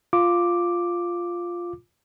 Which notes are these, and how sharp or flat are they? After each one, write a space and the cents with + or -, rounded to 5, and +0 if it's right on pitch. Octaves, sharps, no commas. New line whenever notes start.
F4 +0 D6 +0